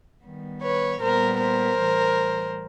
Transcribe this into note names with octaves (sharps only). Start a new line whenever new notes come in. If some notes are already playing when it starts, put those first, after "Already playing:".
D#3 G3 B3
B4 C#5
A#2 G3 B3 A#4 C5
A#4 C5
A2 E3 G3